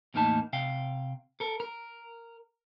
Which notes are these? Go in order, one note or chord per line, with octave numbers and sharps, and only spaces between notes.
E2 A2 A#3 D#4 A5
C3 F5 G5
A4 A#4
A#4